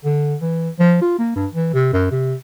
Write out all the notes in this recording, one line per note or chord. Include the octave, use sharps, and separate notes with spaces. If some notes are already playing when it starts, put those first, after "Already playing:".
D3
E3
F3
F4
A#3
G2
E3
C3
F#2
C3